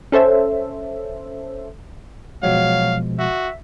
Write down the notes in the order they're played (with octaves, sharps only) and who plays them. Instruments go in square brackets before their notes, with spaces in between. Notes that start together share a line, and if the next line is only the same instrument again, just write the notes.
[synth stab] C#4 A4 C5 E5
[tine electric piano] B2 F3 G#3 [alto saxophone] F#3 [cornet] F5
[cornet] F#4 [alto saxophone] E5